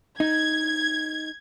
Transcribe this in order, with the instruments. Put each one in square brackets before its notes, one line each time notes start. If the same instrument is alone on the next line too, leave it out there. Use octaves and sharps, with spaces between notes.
[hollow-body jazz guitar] D#4 [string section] G#6